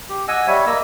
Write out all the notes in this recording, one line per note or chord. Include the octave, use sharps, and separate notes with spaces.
G4
D#5 F#5 G#5 E6
G3 C#5 E5
A#3 D#5 E6